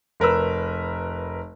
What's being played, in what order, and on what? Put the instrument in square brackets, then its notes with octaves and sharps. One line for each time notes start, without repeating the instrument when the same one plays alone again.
[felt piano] F1 A#4 B4 E6